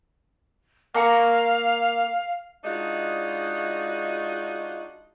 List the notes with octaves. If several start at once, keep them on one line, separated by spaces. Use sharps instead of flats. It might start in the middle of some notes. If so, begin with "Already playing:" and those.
A#3 F5 A#5 C#6
G#3 D4 D#4 F4 F#4